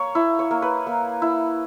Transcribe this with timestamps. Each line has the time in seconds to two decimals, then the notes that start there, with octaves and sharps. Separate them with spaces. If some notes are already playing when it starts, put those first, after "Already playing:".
Already playing: A#3 C#5
0.15 E4
0.39 C#5
0.51 A#3
0.62 B4
0.87 A#3
1.22 E4